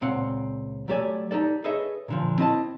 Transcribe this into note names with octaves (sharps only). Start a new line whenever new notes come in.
C#2 A#2 C4 F5 F#5
F#3 A3 G4 A4 D5 G#5
D#4 G4 A4 D5
G#4 A4 B4 C#5 D#5 E5
A#2 D3 F3
C4 E4 D#5 A5